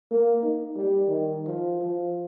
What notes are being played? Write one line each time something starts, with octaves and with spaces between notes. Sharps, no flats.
A#3
D#4
G3
D#3
F3
F3